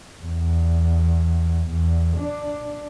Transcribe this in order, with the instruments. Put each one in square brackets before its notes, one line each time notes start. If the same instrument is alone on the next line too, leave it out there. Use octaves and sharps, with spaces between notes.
[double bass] E2
E2
D4